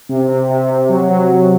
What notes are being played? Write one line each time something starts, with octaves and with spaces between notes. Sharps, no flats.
C3
C3
C3
C3
F#3
F#3